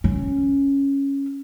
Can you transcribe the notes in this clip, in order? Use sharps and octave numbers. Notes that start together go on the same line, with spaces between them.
C#4